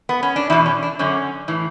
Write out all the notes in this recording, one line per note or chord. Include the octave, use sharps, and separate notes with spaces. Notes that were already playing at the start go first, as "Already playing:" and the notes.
B3
C#4
D4
E2 B2 E4
C#4
D4
F#2 D3 C#4
A2 E3